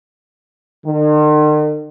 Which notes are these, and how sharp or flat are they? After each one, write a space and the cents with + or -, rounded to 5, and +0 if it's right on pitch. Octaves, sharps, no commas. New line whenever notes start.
D#3 -45